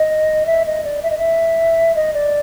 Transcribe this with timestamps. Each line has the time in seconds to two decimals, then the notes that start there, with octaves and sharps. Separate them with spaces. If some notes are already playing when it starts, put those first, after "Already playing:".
Already playing: D#5
0.46 E5
0.66 D#5
0.84 D5
1.03 E5
1.11 D#5
1.18 E5
1.95 D#5
2.14 D5